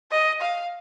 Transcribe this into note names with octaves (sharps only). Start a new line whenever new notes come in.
D#5
F5